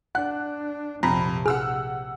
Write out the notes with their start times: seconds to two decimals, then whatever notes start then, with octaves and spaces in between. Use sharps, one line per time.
0.15 D4 F#5 F#6
1.03 A#1 F2 C3 A#5 B5
1.46 G#4 F#5 E6 F6